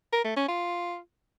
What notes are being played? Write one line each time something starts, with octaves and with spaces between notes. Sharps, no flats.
A#4
A3
C#4
F4